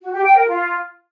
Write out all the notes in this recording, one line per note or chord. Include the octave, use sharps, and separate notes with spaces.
F#4
G4
G5
A#4
F4